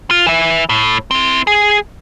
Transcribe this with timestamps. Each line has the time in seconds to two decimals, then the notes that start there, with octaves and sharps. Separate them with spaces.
0.11 F4
0.27 E3 E5
0.69 A2
1.11 C4 E4
1.47 G#4